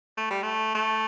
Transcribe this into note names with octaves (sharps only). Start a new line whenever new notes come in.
A3
G3
A3
A3